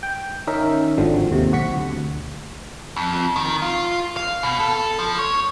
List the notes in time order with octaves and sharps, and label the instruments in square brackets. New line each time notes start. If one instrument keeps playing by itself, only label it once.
[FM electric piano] G5
D#3 C#4 D#4 A#4 E5
G#1 D3 F3 C4 F#4
D#2 C3
B1 F#4 C#6 B6 C#7
D2
[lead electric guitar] F2
D#3
F4
F5
B2
A4
F3
C#5